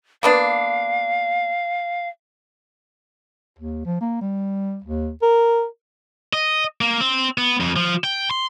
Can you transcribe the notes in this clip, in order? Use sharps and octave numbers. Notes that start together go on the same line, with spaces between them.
A#3 B3 D4 F5
D#2
F3
A#3
G3
D#2
A#4
D#5
A#3
C4
B3
F2
F3
G5
C6